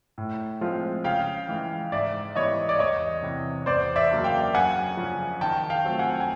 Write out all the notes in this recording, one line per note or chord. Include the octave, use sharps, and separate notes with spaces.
A2
F3 G#3 C4 F4
C#3 F5 G5
E3 G#3
G#2 D5 E5
E3 G3 B3 E4 C#5 D#5
D5
E2 C#5 D#5
C3 E3
E2 C5 D5
D5 E5
C#3 F#3 A#3 D4
F5 G5
F#2 F#5 G#5
C#3 F3
D#3 G5 A5
F5 G5
F#3 A3 C4 F4
F#5 G#5
G#5